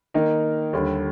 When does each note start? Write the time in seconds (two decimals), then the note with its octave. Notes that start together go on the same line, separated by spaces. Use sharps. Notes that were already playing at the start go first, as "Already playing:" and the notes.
0.14 D#3 A#3 D#4 A#4
0.73 D#2 D3 G3